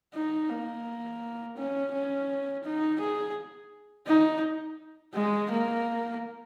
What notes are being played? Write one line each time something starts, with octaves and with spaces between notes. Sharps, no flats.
D#4
A#3
C#4
C#4
D#4
G#4
D#4
G#3
A#3